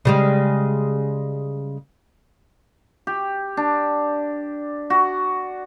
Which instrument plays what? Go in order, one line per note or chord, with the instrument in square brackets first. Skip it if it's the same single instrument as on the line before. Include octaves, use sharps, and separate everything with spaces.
[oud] C#3 G3 G#3
[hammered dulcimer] G4
D4
F#4